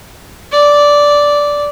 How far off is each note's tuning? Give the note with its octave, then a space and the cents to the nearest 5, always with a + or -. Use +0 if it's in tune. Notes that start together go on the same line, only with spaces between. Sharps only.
D5 -10